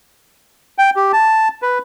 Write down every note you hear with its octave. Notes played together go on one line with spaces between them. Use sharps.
G5
G4
A5
B4